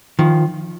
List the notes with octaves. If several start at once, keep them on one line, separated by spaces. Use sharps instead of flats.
D#3 F3